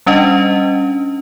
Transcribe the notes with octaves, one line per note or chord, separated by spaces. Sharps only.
G3 C#4 D4 D#5